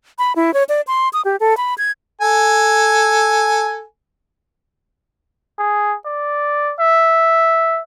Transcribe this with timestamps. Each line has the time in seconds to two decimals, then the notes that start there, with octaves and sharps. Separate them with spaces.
0.19 B5
0.36 E4
0.54 C#5
0.69 D5
0.87 C6
1.13 D#6
1.25 G4
1.40 A4
1.57 B5
1.78 G#6
2.21 A4 G#5
5.59 G#4
6.05 D5
6.80 E5